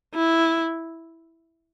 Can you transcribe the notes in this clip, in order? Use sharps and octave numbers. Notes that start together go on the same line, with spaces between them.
E4